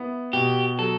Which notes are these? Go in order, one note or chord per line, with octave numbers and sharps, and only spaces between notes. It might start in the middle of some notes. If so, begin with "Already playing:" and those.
Already playing: B3 E4
B2 G4
F#3 A4